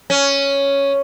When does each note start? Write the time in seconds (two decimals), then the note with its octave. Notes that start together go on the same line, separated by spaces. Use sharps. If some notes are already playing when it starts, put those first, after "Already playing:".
0.10 C#4